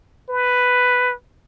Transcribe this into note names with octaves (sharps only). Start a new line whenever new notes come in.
B4